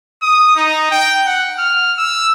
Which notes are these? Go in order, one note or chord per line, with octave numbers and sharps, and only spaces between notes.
D#6
D#4
G5
F#5
F6
E6